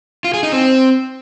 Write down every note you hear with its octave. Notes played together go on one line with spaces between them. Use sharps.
F4
G#4
D#4
C4